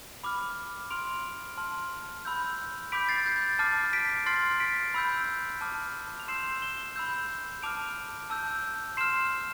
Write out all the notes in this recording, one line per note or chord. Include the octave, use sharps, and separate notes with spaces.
B5 D6 F6
C6 F6 D7 F7
A5 C6 F6
B5 E6 G6
B5 D6 G6 B6 D7
A6 C7
G6
A6
A5 D6 F6 A6 C7
B6 D7
C6 F6 A6 C7
B6 D7
B5 E6 G6
A5 D6 F6
F7
C6 E6 G6 C7 E7
E7 G7
B5 E6 G6
A5 D6 F6 D7 F7
A5 E6 G6
C6 F6 C7 E7